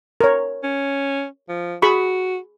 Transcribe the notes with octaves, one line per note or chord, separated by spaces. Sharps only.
A#4 C#5
C#4
F3
F#4 G#4 B5 C#6